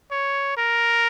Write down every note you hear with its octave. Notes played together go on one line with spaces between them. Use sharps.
C#5
A#4